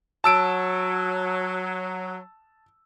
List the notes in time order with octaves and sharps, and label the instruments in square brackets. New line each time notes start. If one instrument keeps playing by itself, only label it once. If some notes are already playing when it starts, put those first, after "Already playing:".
[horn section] F#3 [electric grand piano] A5 E6 D7